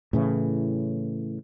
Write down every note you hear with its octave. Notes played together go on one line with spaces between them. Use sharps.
A2 C#3 E3